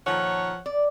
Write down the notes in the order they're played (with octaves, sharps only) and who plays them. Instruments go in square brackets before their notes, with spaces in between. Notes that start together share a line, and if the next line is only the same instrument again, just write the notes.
[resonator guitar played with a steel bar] A#2 D#3 A4 [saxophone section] F3 C#5 F#5
[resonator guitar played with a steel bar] D5